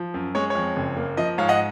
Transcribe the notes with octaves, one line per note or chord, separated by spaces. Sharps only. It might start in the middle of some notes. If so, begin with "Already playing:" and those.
Already playing: F3
F#2
G#3 C#5
C#5
F2
F#1
A#3
F3 D#5
G#2 C#5 F5
D#5 F#5